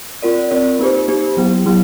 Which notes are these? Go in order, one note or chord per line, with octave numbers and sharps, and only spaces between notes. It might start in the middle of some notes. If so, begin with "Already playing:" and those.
C4 F4 A#4 D5
C4 F4 A#4 D5
A#3 D#4 G4 C5
A#3 D#4 G4 C5
F#3 B3 E4
F#3 B3 E4